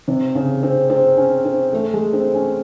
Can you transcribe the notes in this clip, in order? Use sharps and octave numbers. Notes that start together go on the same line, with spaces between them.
C3
C#3
C4
C4
C#4
C4
A3
G#3
C4
C#4